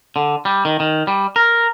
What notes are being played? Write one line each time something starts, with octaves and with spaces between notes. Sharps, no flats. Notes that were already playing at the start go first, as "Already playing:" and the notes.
D3
G3
D#3
D#3
G3
A#4